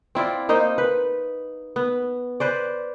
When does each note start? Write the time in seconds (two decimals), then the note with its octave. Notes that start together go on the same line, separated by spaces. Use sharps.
0.15 C4 E4 F4 D5
0.49 A#3 D#4 C5 D#5
0.78 B4
1.76 B3
2.40 B4 C5 D5